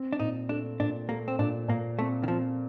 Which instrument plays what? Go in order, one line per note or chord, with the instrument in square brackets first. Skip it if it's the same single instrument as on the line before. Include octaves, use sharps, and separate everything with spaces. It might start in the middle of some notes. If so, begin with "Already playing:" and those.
Already playing: [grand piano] C4
[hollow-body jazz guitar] D4
[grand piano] A#2 [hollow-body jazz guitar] D#4
[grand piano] A3 [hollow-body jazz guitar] D4
[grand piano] A#2 [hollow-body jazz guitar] D4
[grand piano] A3 [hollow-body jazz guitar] A#3
[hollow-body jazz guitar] C4
[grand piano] A#2 [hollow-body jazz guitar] D4
[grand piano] A#2 [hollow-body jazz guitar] A#3
[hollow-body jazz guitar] A3 [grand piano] C4
[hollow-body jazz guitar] D#3
[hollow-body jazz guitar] F3 [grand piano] C4